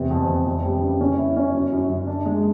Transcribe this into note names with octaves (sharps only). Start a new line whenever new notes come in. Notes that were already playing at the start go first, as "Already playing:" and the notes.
Already playing: E2 C3
F2
F2
F2
G3
C#3
C#4
E4
C#4
F#2
F#2
F#2
D4
G#3